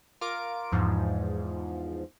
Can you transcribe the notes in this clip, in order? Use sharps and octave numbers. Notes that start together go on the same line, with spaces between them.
F4 A#4 D6 D7
E2 G#2 F3